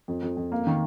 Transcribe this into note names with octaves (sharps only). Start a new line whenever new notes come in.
F2
F2
F2
A#3
D#3